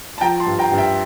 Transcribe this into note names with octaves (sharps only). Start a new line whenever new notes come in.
A5
F3 G5 A#5
A5 C6
G2
G5 A#5
G2
E5 G5